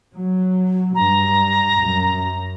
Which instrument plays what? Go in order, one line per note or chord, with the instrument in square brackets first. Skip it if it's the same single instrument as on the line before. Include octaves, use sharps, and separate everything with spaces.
[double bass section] F#3
[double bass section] G2 [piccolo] A#5
[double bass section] F#2